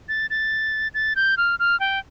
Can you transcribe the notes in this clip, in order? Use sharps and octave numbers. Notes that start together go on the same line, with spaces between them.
A6
A6
A6
G6
F6
F6
G5